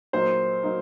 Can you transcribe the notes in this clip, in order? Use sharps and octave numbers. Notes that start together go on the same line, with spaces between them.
A#2 F#3 A#3 D#4 C5
F#3 A#3 D#4